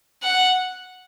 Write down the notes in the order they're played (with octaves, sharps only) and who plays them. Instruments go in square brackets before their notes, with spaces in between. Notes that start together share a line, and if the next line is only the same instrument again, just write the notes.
[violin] F#5